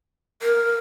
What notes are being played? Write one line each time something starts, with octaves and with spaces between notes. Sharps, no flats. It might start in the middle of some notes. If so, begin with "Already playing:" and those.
A#4